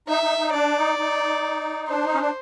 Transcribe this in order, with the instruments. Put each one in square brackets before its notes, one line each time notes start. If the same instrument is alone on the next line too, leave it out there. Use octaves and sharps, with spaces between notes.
[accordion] D#4 [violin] E5
[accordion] D#4
D#4
[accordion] D4 [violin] D5
[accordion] D#4
D#4
[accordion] D4 [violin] C5
[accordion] D#4
C#4
D4